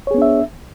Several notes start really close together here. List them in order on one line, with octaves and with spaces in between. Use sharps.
C#5 G#4 B3 D4 E5